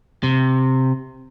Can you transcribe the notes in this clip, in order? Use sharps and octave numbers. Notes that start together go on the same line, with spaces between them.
C3